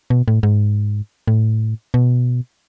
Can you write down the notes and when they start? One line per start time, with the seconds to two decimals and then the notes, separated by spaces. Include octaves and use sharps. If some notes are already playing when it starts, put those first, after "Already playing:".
0.10 B2
0.28 A2
0.43 G#2
1.28 A2
1.94 B2